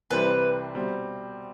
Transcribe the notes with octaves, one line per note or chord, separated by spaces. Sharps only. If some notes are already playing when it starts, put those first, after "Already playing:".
C2 C3 E3 G3 C4 B4
B2 G3 C4